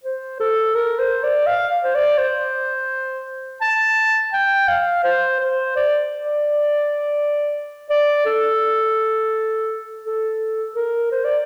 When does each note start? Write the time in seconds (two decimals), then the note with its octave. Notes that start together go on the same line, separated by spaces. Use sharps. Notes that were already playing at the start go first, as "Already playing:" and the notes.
0.04 C5
0.40 A4
0.75 A#4
0.99 C5
1.24 D5
1.47 F5
1.83 C5
1.95 D5
2.18 C5
3.61 A5
4.33 G5
4.68 F5
5.04 C5
5.40 C5
5.76 D5
6.23 D5
7.90 D5
8.26 A4
10.04 A4
10.76 A#4
11.12 C5
11.25 D5